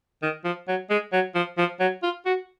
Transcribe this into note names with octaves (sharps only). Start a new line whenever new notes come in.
D#3
F3
F#3
G#3
F#3
F3
F3
F#3
F4
F#4